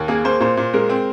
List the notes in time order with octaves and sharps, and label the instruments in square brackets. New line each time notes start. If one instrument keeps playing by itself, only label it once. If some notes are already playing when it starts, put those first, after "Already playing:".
Already playing: [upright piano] D#2 [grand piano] A#4
[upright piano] A#3 [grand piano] G#4
[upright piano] A#3 [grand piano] C5
[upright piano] A#2 [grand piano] C5
[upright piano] A#2
[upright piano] G#3 [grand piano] A#4
[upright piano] C4